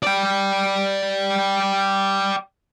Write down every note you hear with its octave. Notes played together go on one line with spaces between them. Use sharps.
D5 G5